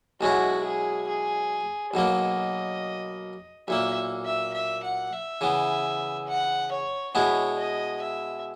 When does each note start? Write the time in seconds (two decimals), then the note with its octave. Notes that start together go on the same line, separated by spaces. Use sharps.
0.20 B1 B2 G#3 C#4 E4 F#4
0.64 G#4
1.07 G#4
1.94 B1 B2 F#3 A#3 D#5
3.68 B1 A#2 A#3 E5
4.25 E5
4.54 E5
4.83 F#5
5.12 E5
5.41 C#3 E3 B3
6.27 F#5
6.72 C#5
7.15 B2 G#3 B3 E4 C#5
7.59 D#5
8.02 E5